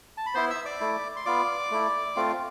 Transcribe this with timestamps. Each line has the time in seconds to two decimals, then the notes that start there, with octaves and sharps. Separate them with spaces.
0.17 A5
0.26 B5
0.34 B3 E4 C5 C6
0.50 E5 E6
0.65 D5 D6
0.80 A3 E4
1.16 C6
1.26 B3 F4 D5 D6
1.71 A3 E4
2.16 A3 C4 F4